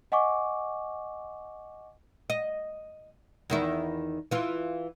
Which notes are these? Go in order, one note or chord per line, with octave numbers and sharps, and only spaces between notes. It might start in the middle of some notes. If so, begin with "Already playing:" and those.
D#5 F#5 G#5 C#6 D6
D#5
E2 D#3 E4
E3 F4